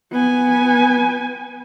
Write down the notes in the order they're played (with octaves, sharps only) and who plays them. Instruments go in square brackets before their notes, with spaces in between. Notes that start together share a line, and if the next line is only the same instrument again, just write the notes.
[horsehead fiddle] B3 G#5